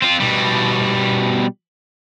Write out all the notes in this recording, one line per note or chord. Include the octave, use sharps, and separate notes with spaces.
C4 F4
B2 G3